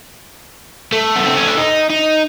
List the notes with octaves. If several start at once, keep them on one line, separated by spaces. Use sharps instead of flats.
A3
B3
C4
C#4
D4
D#4
D#4